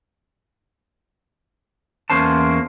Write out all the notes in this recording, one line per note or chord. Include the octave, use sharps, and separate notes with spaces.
E2 A#3 C#4 C5 A5